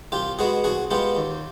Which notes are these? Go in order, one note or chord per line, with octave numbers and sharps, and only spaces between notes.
C2 F4 G4
B2 G#3 B3 F#4 G#4
C2 F#4 G#4
B2 G#3 B3 F4 G4
D#2